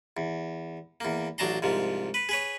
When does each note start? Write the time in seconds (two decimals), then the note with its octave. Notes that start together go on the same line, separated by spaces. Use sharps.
0.17 E2
1.00 E2 A#3
1.38 A1 F#3 D4 A5 A#5 C6
1.62 C2 G#2 F3
2.14 B4
2.29 G#4 B4 C#5